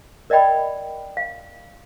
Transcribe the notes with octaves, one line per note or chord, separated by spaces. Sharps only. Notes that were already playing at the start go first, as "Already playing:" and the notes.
A#4 D5 D#5 G5 B5
F5